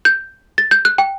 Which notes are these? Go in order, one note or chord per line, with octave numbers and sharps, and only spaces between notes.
G6
A6
G6
F#6
G5